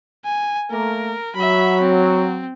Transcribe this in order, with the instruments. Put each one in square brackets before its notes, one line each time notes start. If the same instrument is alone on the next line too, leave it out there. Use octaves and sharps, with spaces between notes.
[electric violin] G#5
[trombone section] A3 A#3 [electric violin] A#4
[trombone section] F#3 [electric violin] E5 B5
[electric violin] C4